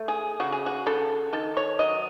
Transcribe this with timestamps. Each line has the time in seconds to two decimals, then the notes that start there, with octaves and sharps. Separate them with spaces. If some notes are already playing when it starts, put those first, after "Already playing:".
Already playing: A3
0.08 G#4
0.40 C#3 F#4
0.52 G#4
0.66 F#4
0.86 C#3 A4
1.33 D#3 A4
1.57 C#5
1.79 F#3 D#5